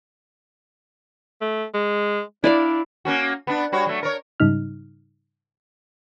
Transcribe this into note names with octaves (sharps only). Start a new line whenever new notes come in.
A3
G#3
D4 E4 D5 F5
A#3 C#4 F#4
B3 D4
G3 F#4 C#5
F#3 A3
A#4 C#5
G#2 C#3 G3 D#4 F6